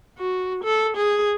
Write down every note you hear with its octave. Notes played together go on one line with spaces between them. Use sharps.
F#4
A4
G#4